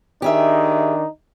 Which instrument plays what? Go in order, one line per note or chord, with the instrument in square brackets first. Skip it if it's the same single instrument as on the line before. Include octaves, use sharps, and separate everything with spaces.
[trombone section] D#3 D4 D#4 [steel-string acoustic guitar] G4 G#4 E5